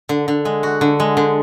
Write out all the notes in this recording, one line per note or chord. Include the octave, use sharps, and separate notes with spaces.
D3
D3
G#3
F#4
D3
G#3
D3